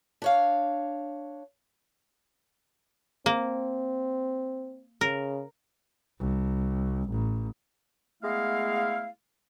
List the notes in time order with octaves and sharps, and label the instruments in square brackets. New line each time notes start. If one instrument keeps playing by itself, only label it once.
[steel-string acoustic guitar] D4 C#5 F5
[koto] A#3 [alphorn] C4
[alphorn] C#3 [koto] A#4
[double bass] C2
A1
[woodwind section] G#3 A3 B3 E4 F5